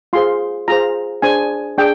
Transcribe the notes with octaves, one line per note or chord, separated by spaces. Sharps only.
F4 G#4 C5 C6
F4 G#4 C5 A#5
D4 G#4 C5 G#5
D4 G#4 G5